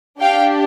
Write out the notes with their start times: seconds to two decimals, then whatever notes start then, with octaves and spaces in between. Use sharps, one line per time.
0.20 D4 G4 F5 G5